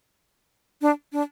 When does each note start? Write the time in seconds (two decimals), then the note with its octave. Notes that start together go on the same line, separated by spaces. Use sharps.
0.82 D4
1.12 D4